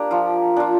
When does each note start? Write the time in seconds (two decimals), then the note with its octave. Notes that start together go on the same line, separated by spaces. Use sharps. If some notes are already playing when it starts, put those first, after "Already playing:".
Already playing: A#3 D4 G4
0.11 F3 F4
0.56 D4 F4